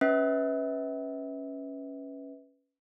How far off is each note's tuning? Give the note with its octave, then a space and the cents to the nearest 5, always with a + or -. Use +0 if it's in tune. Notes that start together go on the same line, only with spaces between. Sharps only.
C#4 +0 B4 +0 E5 -35